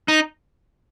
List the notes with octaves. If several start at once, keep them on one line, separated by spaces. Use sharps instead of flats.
D#4